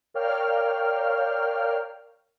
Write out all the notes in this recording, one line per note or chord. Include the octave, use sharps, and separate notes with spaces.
A#4 C#5 D5 F5 G5 F6